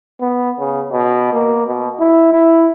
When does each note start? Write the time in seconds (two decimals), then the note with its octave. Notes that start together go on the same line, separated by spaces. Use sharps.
0.21 B3
0.59 C#3
0.92 B2
1.33 A#3
1.66 B2
2.00 E4
2.33 E4